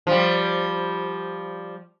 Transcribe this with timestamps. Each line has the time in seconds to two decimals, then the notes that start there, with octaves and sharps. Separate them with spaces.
0.07 F3 G3